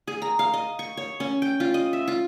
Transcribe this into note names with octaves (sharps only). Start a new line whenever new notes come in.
G#4
A#5
F5
D#5
C#6
C#5
C#4
G5
F4
D#5
E5
F4